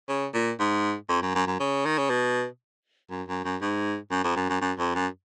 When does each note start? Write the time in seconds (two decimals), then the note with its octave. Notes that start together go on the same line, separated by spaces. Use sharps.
0.09 C#3
0.34 A#2
0.59 G#2
1.09 F2
1.22 F#2
1.35 F#2
1.47 F#2
1.60 C#3
1.85 D#3
1.98 C#3
2.10 B2
3.11 F#2
3.28 F#2
3.45 F#2
3.62 G#2
4.11 F#2
4.24 F2
4.36 F#2
4.50 F#2
4.61 F#2
4.79 F2
4.95 F#2